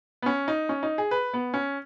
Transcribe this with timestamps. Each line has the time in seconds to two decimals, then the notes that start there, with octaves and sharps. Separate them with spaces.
0.22 B3
0.26 C#4
0.48 D#4
0.69 C#4
0.83 D#4
0.98 G#4
1.11 B4
1.34 B3
1.54 C#4